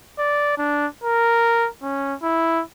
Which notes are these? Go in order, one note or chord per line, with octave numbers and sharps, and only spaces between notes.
D5
D4
A#4
C#4
E4